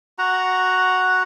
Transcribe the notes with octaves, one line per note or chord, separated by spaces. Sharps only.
F#4 F#5 A#5